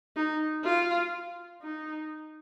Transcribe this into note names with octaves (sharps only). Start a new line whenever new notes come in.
D#4
F4
D#4